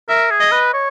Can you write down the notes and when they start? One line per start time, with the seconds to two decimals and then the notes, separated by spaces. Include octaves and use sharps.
0.09 A#4 E5
0.31 G#4
0.41 D#5
0.52 B4
0.73 C#5